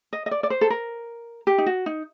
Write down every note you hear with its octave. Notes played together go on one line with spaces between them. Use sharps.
D#5
D#5
D5
D5
C5
A4
A#4
G4
D#4
F#4
D#4